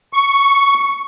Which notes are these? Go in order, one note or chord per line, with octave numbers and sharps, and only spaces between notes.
C#6